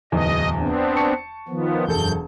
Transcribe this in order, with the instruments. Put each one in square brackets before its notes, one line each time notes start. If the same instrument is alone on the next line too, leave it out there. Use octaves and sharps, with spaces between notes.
[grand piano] D1 E2 [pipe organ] D#5
[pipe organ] B3 C4 D4
[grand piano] A5 C#6 C#7
[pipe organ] D#3 F3 B3
[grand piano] E1 A4 [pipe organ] F#2 G6